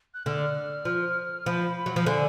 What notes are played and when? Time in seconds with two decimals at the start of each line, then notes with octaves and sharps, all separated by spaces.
0.14 F#6
0.26 D3 F6
0.85 F3
1.46 F3 B5
1.77 B5
1.86 F#3
1.96 F3
2.06 D3 G#5